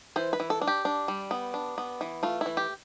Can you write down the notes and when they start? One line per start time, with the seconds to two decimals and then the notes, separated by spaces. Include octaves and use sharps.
0.16 E3 C5
0.33 B4
0.40 E3
0.50 A4
0.61 D4
0.67 G4
0.85 D4
1.08 G3
1.31 B3
1.54 D4
1.78 B3
2.01 E3
2.23 A3 F4
2.41 E3 E4
2.57 G4